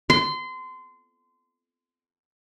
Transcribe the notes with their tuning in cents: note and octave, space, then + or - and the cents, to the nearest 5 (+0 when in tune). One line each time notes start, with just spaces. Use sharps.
C6 -25